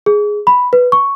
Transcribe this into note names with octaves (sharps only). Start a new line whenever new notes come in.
G#4
B5
B4
C#6